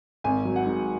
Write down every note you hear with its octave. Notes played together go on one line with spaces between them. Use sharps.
G#1 G#5
F#3
F#5
G#2